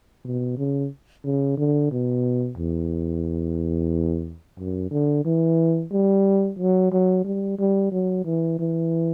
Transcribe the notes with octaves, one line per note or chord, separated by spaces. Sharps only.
B2
C#3
C#3
D3
B2
E2
F#2
D3
E3
G3
F#3
F#3
G3
G3
F#3
E3
E3